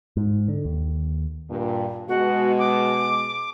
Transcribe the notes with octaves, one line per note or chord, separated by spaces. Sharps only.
G#2
D3
D#2
G2 A#2
B2 G#3 F#4
D6